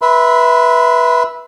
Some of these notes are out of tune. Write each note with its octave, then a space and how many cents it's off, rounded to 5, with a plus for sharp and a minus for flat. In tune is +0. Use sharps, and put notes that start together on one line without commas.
B4 -15 E5 -5 C6 -40